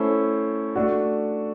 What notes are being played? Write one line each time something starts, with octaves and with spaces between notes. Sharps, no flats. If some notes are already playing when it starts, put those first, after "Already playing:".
Already playing: A3 C#4 E4 A4 C5
A3 D4 F#4